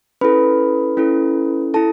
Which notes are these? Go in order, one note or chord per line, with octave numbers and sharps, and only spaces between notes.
C#4 E4 A4 B4 B5
C#4 E4 A4
E4 A4 A5